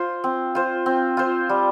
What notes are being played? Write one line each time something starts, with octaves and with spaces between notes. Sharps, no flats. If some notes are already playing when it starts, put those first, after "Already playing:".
Already playing: F4 C5
C4
F4 C5
C4
F4 C5
G3